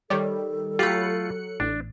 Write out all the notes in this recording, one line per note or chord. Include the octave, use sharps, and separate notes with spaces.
D#3 G3 G4 A4 C#5 D5
F#3 A3 F4 G4 B5 F#6 C#7
A1 D4